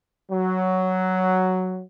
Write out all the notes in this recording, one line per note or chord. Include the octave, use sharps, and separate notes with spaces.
F#3